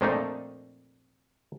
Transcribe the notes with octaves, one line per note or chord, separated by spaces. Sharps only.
F2 A#2 F3 A3 D4 D#4